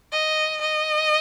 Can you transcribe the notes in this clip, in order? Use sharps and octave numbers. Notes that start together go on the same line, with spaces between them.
D#5
D#5